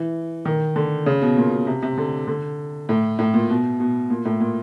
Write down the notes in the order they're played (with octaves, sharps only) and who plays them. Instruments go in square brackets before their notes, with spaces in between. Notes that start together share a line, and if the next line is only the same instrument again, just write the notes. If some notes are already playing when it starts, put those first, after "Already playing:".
Already playing: [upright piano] E3
D#3
D3
C#3
B2
A#2
B2
C3
C3
D3
D3
A2
A2
A#2
B2
B2
A#2
A2
A#2